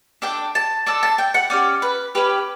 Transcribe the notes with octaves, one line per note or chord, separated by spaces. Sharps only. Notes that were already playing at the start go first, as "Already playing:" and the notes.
D4 A4 G5
A5
D4 A4 A5
A5
G5
F#5
C#4 G4 D5
B4
C#4 G4 B4